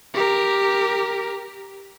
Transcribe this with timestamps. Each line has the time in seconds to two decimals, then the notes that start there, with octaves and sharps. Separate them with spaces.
0.14 G4 A#4